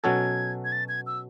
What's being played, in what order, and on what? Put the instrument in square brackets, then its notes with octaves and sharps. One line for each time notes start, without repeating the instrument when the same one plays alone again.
[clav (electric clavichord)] B2 F#3 C#4 F#4 A4 [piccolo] G#6
[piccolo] G#6
A6
G#6
E6